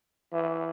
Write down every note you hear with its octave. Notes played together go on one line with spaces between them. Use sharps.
E3